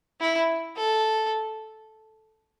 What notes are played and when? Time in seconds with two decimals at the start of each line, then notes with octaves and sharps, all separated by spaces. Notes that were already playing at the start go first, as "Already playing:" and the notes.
0.21 E4
0.77 A4